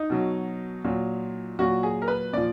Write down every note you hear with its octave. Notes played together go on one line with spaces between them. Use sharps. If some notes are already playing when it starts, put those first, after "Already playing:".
Already playing: D#4
B2 F#3
A#2 F#3
A#2 F#3 F#4
G#4
A#4
B4
A#2 F3 D5